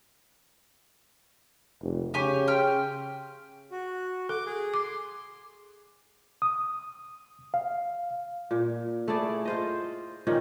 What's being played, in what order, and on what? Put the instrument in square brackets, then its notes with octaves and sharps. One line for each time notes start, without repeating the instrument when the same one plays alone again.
[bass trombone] F1
[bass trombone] C#3 [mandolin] G4 G#5 C#6
[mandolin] G5 C6 F6
[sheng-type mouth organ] F#4
[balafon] A4 [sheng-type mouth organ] D6
[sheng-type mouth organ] G#4
[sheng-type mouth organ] C6 [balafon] D6
[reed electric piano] D#6
F5
[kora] A#2
A3 E4 G#4 D5
F4 C5 D#5
A#2 D#3 C4 C#4